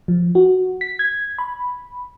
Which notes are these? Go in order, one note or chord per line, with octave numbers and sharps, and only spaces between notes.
F3
F#4
B6
G#6
B5